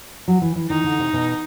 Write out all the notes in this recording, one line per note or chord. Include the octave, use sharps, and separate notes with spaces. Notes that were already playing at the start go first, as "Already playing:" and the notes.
F#3
E3
E3
D#3 D#4
D3
C3
B2